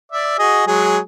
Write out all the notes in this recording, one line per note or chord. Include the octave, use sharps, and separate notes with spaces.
D5 E5
F#4 G#4 D#5
F#3 G#3 G#4